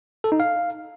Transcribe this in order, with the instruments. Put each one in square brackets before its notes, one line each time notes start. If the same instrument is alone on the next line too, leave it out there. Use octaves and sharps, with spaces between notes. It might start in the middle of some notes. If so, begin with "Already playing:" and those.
[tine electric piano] A4
D#4
F5